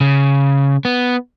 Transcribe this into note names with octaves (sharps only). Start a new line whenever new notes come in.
C#3
B3